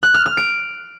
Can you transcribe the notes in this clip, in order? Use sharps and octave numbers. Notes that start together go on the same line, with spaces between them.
F#6
F6
F6
D7